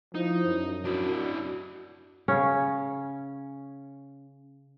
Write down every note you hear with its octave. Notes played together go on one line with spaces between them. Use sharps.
F3 D#4 E4
F#2
D4 E4 F#4
C#3 C#4